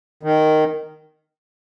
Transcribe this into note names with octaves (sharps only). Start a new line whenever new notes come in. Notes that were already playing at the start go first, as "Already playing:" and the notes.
D#3